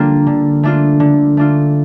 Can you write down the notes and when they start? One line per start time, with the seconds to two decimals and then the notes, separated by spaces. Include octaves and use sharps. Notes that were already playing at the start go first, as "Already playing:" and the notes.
Already playing: D3 G3 A#3 D4 F4
0.27 D3
0.63 A3 D4 F4
1.00 D3
1.37 A3 D4 F4